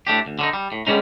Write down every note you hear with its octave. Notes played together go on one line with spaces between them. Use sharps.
A2 A3 D4 G4
D2
D3 C#4 D#4
G3
A2
D3 G3 G#3 C#4 D#4